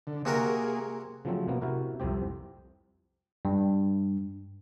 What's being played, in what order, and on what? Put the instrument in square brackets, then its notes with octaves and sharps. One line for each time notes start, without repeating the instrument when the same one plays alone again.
[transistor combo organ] D3
[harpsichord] C3 F#4 A#4 [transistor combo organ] A#3 G#4
[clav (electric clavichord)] C#3 F3 F#3 A3 C4
B2 A#3 B3
C3 E4 F#4 A#4
C2 F2 C3 C4 G4
[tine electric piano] G2